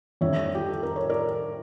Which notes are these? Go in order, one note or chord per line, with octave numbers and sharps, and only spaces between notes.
F2 D3 G3 C#5 E5
G4
A4
A#4
C#5
A#4 D5